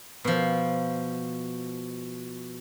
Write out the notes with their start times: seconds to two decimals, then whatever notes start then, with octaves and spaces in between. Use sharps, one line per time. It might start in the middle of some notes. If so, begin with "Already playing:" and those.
0.24 B2 F3